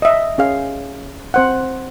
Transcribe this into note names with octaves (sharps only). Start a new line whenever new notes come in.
D#5 E5
C#4 G#4 F5
C4 C5 F#5